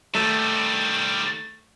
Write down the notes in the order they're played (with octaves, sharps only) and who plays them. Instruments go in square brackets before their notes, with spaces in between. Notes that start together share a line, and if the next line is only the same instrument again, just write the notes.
[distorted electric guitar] D#3 G3 [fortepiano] A3